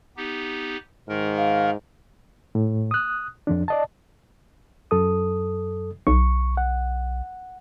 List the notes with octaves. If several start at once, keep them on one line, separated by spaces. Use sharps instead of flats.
B3 D#4 G4
G#2 D#3 A#4
F5
A2
D#6 F#6
F2 F3 D4
D5 D#5 A5
F#2 A4 D#6
B1 C#6
F#5